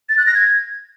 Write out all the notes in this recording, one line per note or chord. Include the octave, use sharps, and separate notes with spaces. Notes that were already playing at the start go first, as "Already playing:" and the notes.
A6
F#6
A#6
G#6